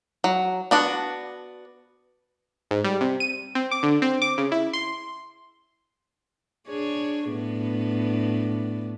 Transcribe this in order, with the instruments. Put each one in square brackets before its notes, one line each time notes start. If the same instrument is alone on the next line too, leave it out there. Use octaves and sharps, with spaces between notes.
[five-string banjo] F#3
B3 D4 F#4
[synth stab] G#2
G3
C3
D#7
C4
D6
D3
C4
D6
C#3
E4
C6
[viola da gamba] D4 G#4 C#5
A2 B3 D4